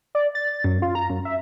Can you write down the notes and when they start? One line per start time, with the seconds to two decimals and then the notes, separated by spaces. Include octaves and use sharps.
0.15 D5
0.35 A6
0.64 F#2
0.82 F4
0.95 A#5
1.10 F#2
1.25 E5